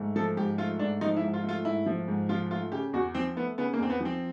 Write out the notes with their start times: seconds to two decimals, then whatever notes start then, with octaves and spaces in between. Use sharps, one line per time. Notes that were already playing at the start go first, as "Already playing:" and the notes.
Already playing: G#2 A3
0.16 F3 A4
0.37 G#2 G4
0.58 A3 F4
0.79 G#2 D4
1.01 F3 D#4
1.16 E4
1.22 G#2
1.34 F4
1.44 A3 F4
1.65 G#2 E4
1.86 F3
2.08 G#2
2.29 F3 F4
2.51 A3 F4
2.72 C#3 G4
2.93 E2 F#4
3.15 F3 C4
3.36 A3 B3
3.58 C#3 B3
3.73 A#3
3.79 E2 C4
3.90 B3
4.00 F3 C4